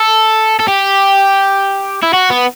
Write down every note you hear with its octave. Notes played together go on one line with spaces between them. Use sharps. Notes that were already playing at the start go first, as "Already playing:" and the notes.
Already playing: A4
A4
G4
E4
F#4
B3